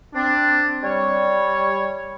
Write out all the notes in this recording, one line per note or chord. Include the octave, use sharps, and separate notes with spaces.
C4 D4
G3 C#5